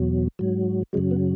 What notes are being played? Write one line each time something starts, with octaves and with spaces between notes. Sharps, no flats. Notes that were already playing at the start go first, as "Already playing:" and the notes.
Already playing: E2 B2 F#3
G#2 F#3
F#2 C#3 F#3 G#3
B3